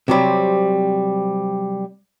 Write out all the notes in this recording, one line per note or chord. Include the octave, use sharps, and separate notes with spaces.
C3 F#3 G3 C4